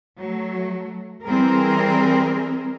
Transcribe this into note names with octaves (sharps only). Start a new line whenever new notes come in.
F#3 A3
E3 G3 C4 G#4 A#4